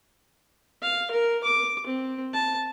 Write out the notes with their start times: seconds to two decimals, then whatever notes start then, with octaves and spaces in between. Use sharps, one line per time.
0.82 F5
1.11 A#4
1.44 D6
1.87 C4
2.33 A5